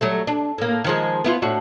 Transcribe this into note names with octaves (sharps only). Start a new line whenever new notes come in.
F#3 G3 A3
D4
A2 A#3
D#3 F3 G#3
B3 E4 F4
A2 D4 F#4